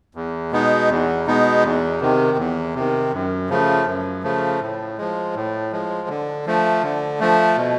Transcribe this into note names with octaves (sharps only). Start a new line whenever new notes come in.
E2
B2 G#3 B3 D#4
E2
B2 G#3 B3 D#4
E2
C3 D#3
E2
C3 D#3
F#2
C#3 F3 A3
F#2
C#3 F3 A3
A2
F3 G#3
A2
F3 G#3
D3
F3 A3
D3
F3 A3
B2